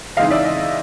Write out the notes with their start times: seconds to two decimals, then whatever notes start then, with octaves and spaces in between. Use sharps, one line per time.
0.17 C#3 E3 G#3 C4 D#4 D#5 F5
0.31 D5 E5
0.44 D#5